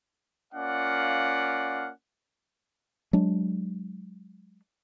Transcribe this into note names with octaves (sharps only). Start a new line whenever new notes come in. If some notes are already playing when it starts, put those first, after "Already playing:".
A#3 C#4 F4 D5 F5 F#5
F#3 G#3 D4